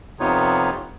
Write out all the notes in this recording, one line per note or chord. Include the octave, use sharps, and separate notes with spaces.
F2 C3 B3 D#4 F4 C#5